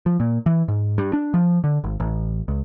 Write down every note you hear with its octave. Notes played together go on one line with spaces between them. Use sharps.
F3
A#2
E3
G#2
G2
D4
F3
D3
G#1
A1
C#2